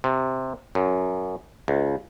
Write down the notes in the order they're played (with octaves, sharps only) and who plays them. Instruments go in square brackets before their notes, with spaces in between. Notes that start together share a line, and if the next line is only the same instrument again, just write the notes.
[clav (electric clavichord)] C3
F#2
C#2